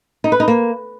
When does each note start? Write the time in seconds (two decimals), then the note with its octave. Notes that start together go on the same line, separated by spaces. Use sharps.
0.24 D#4
0.32 B4
0.40 D#4
0.48 A#3